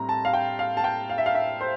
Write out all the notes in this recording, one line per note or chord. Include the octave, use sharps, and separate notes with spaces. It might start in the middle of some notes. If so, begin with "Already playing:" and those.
Already playing: A2 G3 C4 A#5
A5
F5
G5
F5
A5
G5
F5
E5
F5
E5
C5